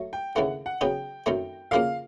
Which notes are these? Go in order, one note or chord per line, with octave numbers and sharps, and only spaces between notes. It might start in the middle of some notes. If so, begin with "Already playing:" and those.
Already playing: F#3 A3
G5
D#2 C#3 E3 A3 C4 F#5
F#5
C#3 F#3 B3 D#4 G5
F#2 D#3 F#3 A3 C4
D2 C#3 F3 A#3 F5